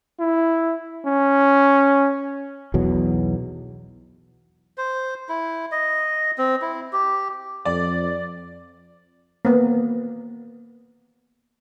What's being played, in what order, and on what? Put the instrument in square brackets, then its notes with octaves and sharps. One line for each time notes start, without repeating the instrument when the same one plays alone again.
[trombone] E4
C#4
[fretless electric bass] B1 E2 B2 F#3
[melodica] C5
E4
D#5
C4
E4
G4
[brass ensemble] F2 [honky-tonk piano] D5
[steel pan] A#3 B3